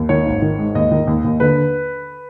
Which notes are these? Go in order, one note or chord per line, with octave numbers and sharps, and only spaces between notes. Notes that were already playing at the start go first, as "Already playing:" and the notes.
Already playing: D#2
D#3 C#5
G#1
D#3
G#2
D#2 D#5
D#3
D#2
D#2
D3 B4